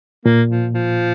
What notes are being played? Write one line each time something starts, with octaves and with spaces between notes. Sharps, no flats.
A#2 A#3
F3
F3